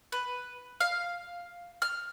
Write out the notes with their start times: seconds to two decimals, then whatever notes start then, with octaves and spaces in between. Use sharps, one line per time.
0.12 B4
0.80 F5
1.82 F6